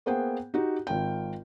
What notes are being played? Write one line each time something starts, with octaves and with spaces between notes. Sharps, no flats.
A#3 B3 G#4 C5 F#5 G5
D#4 F#4 G4
G#1 F4 G5